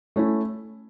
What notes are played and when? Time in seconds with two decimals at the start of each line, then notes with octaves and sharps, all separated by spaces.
0.16 A3 C#4 E4